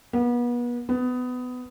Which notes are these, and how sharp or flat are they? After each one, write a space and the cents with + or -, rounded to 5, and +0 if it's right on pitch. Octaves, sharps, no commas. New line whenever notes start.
B3 -35
B3 +20